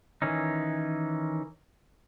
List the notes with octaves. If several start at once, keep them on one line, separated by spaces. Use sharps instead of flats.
D#3 E3 C#4 D#4